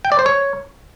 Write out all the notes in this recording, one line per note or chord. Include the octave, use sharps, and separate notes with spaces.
G5
D5
C5
C#5